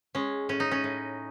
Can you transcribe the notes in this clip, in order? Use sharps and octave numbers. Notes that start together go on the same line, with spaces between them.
G#3 C#4
A2 C#4
D#4
C#4
A2